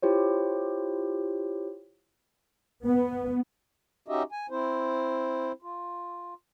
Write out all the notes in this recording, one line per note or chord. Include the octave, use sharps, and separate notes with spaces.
E4 F4 G4 C5 C#5
B3
C#4 D#4 F#4 G4 D#5 E5
G#5
C4 E4 C5
F4